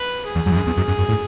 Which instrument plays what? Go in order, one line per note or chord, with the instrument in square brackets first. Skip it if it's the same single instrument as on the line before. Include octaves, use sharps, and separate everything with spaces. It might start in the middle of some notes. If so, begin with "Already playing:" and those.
Already playing: [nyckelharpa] B4
G#4
[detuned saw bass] E2
F#2
E2
F#2
E2
F#2
F#2
F#2
A2